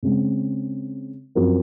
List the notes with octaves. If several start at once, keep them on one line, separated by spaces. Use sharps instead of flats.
C#3 G#3 C4
F#2 F3 C4 F#4 A#4